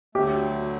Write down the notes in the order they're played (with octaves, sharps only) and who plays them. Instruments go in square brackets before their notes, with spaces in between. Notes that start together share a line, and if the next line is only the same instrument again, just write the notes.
[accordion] D2 D3 F#3 A3 [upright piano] G4